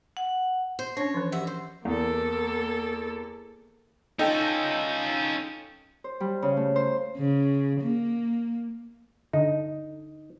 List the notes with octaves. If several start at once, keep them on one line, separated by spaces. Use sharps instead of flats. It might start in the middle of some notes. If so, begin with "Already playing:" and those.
F#5
C5
C#4 D4 C#5
E3 F3
G2 F#4 E5
C5
E2 A#3 A4
C#4 D#4 F4 A4 G5
C5
G3
C#3
A3
C5
C#3
A#3
D3 D#4